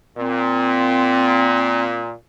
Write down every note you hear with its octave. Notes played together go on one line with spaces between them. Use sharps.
A#2 C4